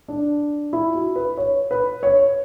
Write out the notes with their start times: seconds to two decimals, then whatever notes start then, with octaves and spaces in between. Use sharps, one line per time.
0.08 D4
0.73 E4
0.95 F#4
1.16 B4
1.37 C#5
1.71 B4
2.03 C#5